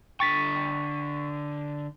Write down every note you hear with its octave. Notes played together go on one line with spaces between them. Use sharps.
D3 G5 C#6 A6 B6